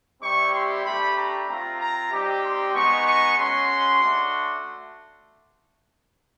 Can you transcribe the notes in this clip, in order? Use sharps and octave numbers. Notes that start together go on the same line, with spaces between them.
G3 C4 E4 G4 C#6
C6
A3 D4 G4 B5
A#5
C4 F4 A#5
A#5
G3 C4 D#4 G4
C6
G#3 B3 D#4 C#6
C#6
G#3 C#4 F#4 C6
A3 D4 F#4